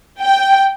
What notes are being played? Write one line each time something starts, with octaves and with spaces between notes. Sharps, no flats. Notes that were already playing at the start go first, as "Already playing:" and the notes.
G5